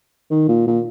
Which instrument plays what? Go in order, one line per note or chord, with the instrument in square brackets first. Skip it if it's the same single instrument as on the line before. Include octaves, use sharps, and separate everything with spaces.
[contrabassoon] D#3
A#2
A#2